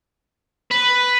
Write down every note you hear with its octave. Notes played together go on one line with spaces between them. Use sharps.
B4